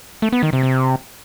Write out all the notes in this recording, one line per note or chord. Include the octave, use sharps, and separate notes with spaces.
A3
B3
D#3
C3
C3